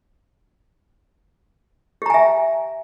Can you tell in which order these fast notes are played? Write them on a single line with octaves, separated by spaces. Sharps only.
G4 A#5 G#5 E5